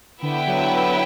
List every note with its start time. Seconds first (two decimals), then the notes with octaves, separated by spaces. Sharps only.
0.22 D3 B3 E4 B4 E5 G5
0.47 D3 F#3
0.71 D3